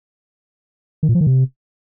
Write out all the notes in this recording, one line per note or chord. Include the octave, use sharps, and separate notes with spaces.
D#3
A#2
F3
D#3
C3